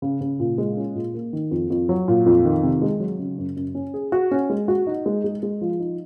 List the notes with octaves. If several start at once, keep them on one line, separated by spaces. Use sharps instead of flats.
C#3
C#3
A#2
G#3
C#4
A#2
A#3
D#3
F2
F2
F#3
A#2
F2
D#3
C3
G#3
F#3
C#3
F#2
F#2
C#4
G#4
F#4
C#4
G#3
F#4
D#4
G#3
G#3
G#3
F3
D#4